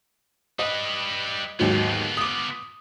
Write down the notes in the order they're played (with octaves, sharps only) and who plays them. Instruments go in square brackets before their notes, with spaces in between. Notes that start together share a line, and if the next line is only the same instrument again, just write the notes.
[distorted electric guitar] G3 B4 [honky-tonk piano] D#5
[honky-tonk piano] D#2 G#2 F#3 [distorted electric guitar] B3 F4
[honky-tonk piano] D6 D#6